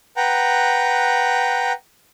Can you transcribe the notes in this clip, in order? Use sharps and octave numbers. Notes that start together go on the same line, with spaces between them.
B4 F#5 G5 A#5